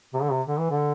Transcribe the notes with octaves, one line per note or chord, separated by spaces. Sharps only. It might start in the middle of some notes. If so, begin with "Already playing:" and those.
C3
D3
C3
D3
E3
D3